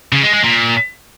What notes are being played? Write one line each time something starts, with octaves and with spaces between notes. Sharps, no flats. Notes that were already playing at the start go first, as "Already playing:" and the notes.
C#3
G#3
G#3
A#2